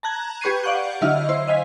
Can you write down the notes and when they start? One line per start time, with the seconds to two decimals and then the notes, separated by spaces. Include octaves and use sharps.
0.03 A5 A#5 F#6 G#6
0.41 G4 B4 C#6 G#6 C7 D#7
0.64 D5 F5 F#5 C#6 F#6 G6
1.01 D3 F#3 E4 D#5 F6
1.29 E4 C5
1.47 D#5 F5 G#5 B6